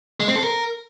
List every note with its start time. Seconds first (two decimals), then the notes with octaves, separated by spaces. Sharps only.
0.20 G#3
0.28 C4
0.36 A4
0.43 A#4